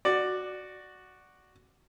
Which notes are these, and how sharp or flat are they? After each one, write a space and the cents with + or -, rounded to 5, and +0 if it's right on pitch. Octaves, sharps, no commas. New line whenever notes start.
F#4 +0 D5 +10